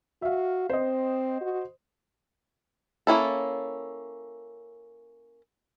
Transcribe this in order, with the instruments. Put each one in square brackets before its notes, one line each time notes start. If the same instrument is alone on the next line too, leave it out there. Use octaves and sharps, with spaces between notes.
[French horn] F#4 [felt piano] E5 F5
[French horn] C4 [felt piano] C5 D#5
[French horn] F#4
[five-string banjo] A#3 C#4 E4 A4